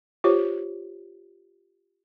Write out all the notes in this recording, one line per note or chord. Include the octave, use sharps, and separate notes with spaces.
F4 G4 C5 C#5